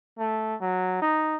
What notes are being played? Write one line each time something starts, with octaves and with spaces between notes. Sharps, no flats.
A3
F#3
D#4